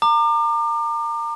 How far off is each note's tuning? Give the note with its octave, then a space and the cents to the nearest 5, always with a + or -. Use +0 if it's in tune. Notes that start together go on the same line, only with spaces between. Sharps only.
A#5 -25 D6 +35